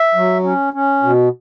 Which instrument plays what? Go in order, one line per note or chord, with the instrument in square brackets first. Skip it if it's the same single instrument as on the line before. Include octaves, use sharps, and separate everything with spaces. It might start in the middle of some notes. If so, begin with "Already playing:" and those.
Already playing: [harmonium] E5
F#3
C#4
C#4
B2